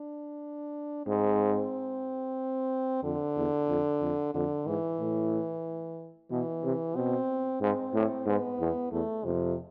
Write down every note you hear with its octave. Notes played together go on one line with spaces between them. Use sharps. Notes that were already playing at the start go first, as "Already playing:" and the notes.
Already playing: D4
G#2 C4
F2 D3
E2
F2
F2
F2 D3
G#2 E3
A2
B2 E3
C3
B2 C4
G#2 C4
A2
G#2 B3
E2
E2 A3
F2 C3